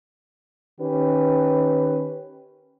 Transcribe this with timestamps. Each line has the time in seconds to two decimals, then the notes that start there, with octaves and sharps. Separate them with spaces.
0.79 D#3 C#4 G4 B4